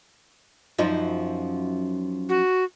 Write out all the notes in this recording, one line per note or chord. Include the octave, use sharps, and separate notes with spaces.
F#2 F3 D#4
F#4